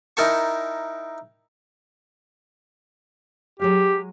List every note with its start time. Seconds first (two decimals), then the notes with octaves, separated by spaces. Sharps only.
0.17 D#4 E4 A#4 G5 A5 C#6
3.60 F#3 G#3 G4 F5